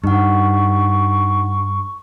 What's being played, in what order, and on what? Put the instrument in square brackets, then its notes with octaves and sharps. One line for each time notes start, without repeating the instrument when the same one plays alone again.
[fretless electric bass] G2 [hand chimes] D#4 F#5 [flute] C#6